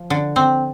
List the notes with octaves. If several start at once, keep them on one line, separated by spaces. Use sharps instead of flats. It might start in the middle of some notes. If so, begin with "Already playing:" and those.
Already playing: F3
D3
C4